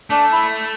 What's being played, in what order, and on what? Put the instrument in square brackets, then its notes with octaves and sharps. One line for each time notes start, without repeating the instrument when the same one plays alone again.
[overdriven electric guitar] A3 [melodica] D4
[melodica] E4